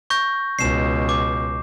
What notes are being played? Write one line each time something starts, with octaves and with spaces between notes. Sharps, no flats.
C#6 G6 A#6
C#2 B2 C7 E7
D6